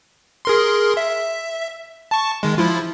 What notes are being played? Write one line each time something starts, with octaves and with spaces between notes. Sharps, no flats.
G#4 A#4 C6
E5
A5 C#6
D#3 G#3
F3 E4 F4